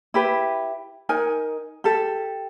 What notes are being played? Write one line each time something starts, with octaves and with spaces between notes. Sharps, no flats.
E4 G4 B4
D#4 A#4 G#5
G4 A4